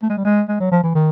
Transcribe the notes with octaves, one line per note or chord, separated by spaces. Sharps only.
A3
G#3
G3
G#3
G#3
F#3
F3
E3
D#3